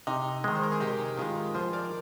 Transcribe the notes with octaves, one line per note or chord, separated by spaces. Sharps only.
C3 D#4
D#3 G#3
C5
A#4
G#4
C3 D#4 G4
D#3 G#3 F4 G#4
F3 G#4 C5
A#4 D5